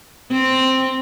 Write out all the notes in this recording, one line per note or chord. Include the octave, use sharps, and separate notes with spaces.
C4